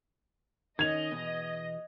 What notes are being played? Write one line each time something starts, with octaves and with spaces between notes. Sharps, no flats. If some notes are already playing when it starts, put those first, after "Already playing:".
D#3 C#4 D#5 G#6 F7
E2 B2